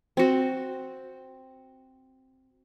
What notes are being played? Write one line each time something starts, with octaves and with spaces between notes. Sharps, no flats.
C4 F#4